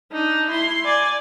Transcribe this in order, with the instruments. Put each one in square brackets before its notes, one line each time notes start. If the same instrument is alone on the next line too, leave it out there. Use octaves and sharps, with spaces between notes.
[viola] D4 D#4
E4 C6
D5 G#5